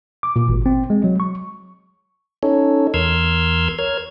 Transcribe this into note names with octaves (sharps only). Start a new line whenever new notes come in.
D6
A#2
G#1
C4
G#3
F#3
C#6
C#4 D#4 A4 C#5
E2 A#4 C6 E6 F6 G#6
A#4 C#5 F6 G#6